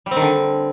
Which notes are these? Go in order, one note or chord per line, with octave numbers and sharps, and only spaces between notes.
G3
C4
D#3
D3